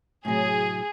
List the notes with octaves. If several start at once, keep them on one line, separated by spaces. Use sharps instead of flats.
A2 C3 F#3 G#4